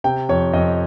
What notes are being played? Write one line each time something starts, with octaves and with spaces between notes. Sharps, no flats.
C3 G5
F2 C#5
F2 D#5